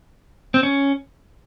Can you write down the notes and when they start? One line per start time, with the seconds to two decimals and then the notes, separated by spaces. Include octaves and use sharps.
0.54 C4
0.63 C#4